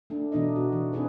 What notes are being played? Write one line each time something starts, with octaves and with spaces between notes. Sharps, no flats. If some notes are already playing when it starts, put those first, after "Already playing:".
A3 D4
B2 E3 D4 D#4 D#5
F#4
E3
C4 D4 D#4 G#4 B4